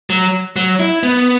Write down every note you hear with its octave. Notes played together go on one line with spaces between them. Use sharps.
F#3
F#3
E4
B3